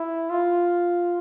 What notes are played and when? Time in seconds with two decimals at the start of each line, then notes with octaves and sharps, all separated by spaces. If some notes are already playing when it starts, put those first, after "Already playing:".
Already playing: E4
0.30 F4